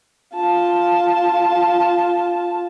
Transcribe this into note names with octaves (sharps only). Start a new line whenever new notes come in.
F4 A5